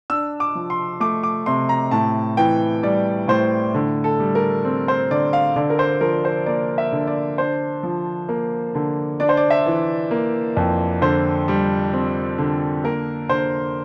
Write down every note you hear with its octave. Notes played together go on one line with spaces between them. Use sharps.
D4 E6
D6
F3
C6
A3 D6
D6
C3 C6
A#5
A2 A5
E3 G5
G3 D5
A2 C5
D3
A4
G3
A#4
C4
C5
D3 D5
F5
D3 D5
A#4
C5
F3 A#4
C5
A#3 D5
E5
D3
D5
D4 C5
F3
A#3
D3
D4 D5
C5
D5
E5
E3
A#3
F2
D3 C5
G3
C4
D3
A#3 A#4
D3 C5